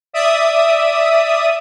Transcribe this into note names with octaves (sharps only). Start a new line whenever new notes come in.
D5 E5 D#6